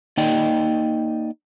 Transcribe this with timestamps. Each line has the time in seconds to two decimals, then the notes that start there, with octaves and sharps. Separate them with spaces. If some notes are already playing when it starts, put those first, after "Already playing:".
0.17 A#3 D#4 D5 D#5 G5